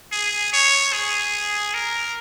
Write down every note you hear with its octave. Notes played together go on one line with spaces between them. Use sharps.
G#4
C#5
G#4
A#4